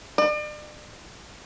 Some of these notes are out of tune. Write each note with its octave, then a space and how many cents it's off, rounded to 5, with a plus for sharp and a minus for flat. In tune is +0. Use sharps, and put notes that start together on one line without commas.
D5 +40